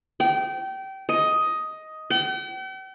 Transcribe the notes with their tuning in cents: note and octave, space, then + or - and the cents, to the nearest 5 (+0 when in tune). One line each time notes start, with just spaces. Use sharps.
G5 -25
D#5 +10
G5 -45